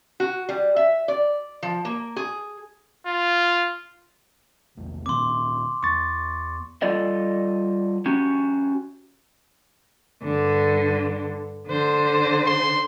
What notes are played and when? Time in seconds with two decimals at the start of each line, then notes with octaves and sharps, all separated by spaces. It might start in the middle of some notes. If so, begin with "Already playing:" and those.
0.20 F#4
0.49 G3
0.76 E5
1.08 D5
1.63 F3
1.85 A#3
2.16 G#4
3.06 F4
4.77 A#1 E2
5.06 A#2 D#3 C4 C6 D6
5.83 E2 C#6 A6
6.82 G3 F4 A4 D5 D#5
8.06 C#4 F#4 G4
10.24 G2 D3
11.68 D3 C5
12.46 C6